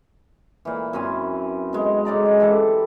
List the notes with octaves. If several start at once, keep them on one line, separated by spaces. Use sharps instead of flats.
A#2 E3
F#2 E3 C4 G#5
B2 G#3
G#2 C#3 D5 A#5
G#3
E3 G4 A4 D5